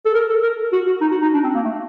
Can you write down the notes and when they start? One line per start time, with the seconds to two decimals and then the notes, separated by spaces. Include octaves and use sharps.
0.05 A4
0.14 A#4
0.29 A4
0.43 A#4
0.72 F#4
0.87 F#4
1.01 D#4
1.11 F#4
1.22 D#4
1.34 D4
1.44 C4
1.55 A#3
1.65 A3